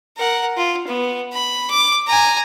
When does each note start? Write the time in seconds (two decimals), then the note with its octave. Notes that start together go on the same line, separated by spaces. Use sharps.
0.17 A#4 F#5
0.57 F4
0.87 B3
1.33 B5
1.70 D6
2.07 G#5 A#5